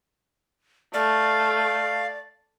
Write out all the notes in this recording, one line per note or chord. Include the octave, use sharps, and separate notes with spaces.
A3 D5 F5